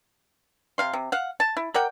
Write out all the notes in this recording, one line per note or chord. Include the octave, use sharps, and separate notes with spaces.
C3 F5 C6
C3
F5 F#5
A5
E4
A#4 D5 F#5 G5